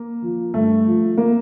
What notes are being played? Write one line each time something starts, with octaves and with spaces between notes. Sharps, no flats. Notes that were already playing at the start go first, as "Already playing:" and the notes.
Already playing: A#3
F3
G2 A3
F3
A#3